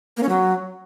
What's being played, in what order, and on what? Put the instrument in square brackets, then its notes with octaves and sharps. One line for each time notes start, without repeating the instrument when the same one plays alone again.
[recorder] A#3
C#4
F#3